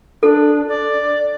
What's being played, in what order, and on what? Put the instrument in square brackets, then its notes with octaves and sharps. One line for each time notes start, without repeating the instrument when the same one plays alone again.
[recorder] D4 [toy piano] A4
[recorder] D5